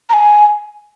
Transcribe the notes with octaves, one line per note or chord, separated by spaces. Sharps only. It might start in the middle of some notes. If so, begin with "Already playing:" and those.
A#5
G#5